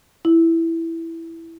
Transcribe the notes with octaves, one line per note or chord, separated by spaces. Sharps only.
E4